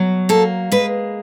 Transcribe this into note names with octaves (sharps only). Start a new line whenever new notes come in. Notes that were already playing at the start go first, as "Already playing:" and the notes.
Already playing: B2 F#3
A#3 A4
G#3 B4